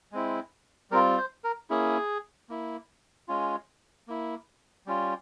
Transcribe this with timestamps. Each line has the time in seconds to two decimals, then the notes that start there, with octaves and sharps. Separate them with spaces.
0.12 G#3 C4 E4
0.91 G3 C4 F4 A#4
1.18 C5
1.44 A#4
1.70 A#3 C#4 E4 G#4
2.49 A#3 E4
3.28 G#3 C#4 F4
4.08 A#3 E4
4.86 G3 C#4 F4